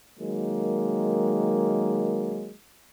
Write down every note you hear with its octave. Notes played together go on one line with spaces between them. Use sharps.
D#3 F#3 G#3 A#3